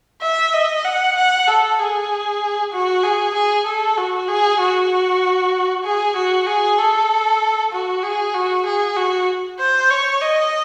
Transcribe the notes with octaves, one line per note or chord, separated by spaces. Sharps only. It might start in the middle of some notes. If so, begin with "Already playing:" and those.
E5
D#5
F#5
F#5
A4
G#4
F#4
G#4
G#4
A4
F#4
G#4
F#4
G#4
F#4
G#4
A4
F#4
G#4
F#4
G#4
F#4
C5
C#5
D#5